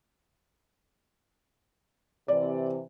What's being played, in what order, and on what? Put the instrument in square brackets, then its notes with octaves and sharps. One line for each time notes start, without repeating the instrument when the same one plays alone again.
[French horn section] C3 E3 [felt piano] D5